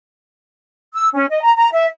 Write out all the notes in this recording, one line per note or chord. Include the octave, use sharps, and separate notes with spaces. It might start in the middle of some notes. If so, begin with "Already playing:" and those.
E6
C#4
D#5
A#5
A#5
E5